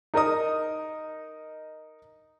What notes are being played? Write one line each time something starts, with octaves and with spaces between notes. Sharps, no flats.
D#4 A#4 D#5 D#6